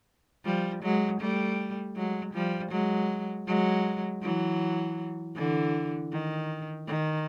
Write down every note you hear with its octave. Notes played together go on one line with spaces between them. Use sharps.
F3 G3
F#3 G#3
G3 A3
F#3 G#3
F3 G3
F#3 G#3
F#3 G#3
E3 F#3
D3 E3
D#3
D#3